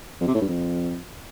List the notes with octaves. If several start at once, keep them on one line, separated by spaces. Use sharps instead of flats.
F2
C3
A2
G2
F2